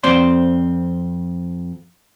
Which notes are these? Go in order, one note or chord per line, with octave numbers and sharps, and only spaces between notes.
F2 C4 C5 D5 C6